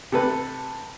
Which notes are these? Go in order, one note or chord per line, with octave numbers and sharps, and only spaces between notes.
C3 A4 B4